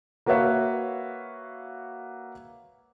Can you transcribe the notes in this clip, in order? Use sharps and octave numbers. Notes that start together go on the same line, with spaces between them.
A#3 F#4 B4 C#5 E5 F5